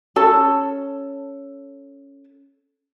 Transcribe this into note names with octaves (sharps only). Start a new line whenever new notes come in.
C#4 A4 A5